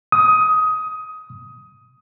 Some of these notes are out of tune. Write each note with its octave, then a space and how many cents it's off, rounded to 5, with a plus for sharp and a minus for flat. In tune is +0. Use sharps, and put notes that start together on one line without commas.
D#6 +15